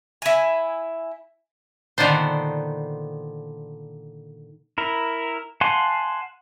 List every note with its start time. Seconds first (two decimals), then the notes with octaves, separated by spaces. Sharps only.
0.22 E4 G#5
1.98 A#2 D3 D#3 B3 D4 C5
4.78 E4 A#4
5.61 F5 F#5 G#5 A5 C6